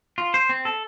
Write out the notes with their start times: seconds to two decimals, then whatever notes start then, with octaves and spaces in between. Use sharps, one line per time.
0.18 F4
0.34 C5
0.49 C4
0.65 A4